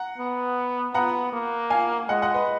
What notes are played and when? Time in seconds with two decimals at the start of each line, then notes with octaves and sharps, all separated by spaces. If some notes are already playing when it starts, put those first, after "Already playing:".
Already playing: F#5 A#5
0.18 B3
0.94 B3 F#5 A#5
1.33 A#3
1.70 F5 G#5
2.08 G#3 D#5 F#5
2.22 D#5 F#5
2.34 B4 D#5